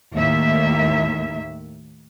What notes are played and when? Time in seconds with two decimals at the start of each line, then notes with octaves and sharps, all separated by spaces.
0.16 D#2 A2 D#3 A#3 E5